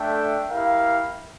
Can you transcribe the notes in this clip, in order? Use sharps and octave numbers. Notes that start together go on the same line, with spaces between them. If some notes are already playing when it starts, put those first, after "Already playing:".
Already playing: A3 D4 A4 E5 G5
E4 G4 A#4 F5